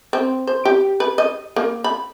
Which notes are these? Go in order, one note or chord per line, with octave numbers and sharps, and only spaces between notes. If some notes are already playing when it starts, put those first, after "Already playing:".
C4
C5
G4
B4
D#5
A#3
B5